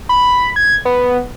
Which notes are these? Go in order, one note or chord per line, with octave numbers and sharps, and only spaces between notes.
B5
G#6
B3